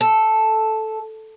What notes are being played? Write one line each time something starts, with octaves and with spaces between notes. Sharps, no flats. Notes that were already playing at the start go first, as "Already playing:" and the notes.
A4